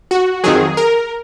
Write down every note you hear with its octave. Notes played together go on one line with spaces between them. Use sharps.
F#4
F2 D#3 F#3 G#4
A#4